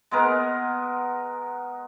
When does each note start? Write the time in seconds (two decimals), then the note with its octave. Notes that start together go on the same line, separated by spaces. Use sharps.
0.11 G#3 B3 A#4